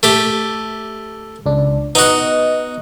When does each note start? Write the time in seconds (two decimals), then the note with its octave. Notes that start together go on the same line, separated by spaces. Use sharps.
0.03 A3 G4
1.46 C#2 D4
1.95 B3 D#4 F#4 D#5